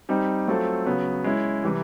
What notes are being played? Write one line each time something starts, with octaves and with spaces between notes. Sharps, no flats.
G3 C4 D#4 G4
F#3 A3 C4 F4 A4
C#3 F#3 B3
G#3 C#4 E4
C3 E3 G3